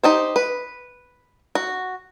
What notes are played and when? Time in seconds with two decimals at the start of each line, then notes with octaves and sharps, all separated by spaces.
0.04 D#4 G4 C5
0.36 B4
1.55 F#4